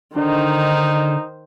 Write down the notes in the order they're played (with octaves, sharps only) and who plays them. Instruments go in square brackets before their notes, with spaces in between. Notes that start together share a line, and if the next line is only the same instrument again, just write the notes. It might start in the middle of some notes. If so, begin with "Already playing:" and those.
[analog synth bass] D3 [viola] D#3 C5 [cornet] D#4